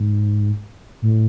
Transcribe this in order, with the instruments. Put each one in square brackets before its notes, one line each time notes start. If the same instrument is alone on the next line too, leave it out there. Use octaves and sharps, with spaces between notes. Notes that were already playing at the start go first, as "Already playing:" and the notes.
Already playing: [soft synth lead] G#2
A2